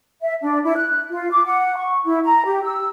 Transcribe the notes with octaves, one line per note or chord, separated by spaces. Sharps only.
E5
D4
E4
F#6
F4
D6
F#5
C#6
E4
A#5
G4
E6